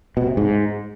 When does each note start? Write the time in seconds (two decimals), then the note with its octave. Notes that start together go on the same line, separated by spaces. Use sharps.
0.17 B2
0.27 C3
0.37 G#2